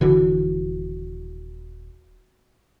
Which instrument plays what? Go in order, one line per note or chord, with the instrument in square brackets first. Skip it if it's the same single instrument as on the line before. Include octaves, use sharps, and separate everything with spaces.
[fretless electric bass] D#1 D3 E3 [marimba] F#4